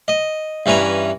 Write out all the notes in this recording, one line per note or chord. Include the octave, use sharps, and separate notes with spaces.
D#5
G2 E3 C#4 A#5 B5